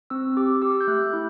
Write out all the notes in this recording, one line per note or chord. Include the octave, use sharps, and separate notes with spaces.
C4 E6
G4 D6
G4 E6
G6
A3 F#6
E4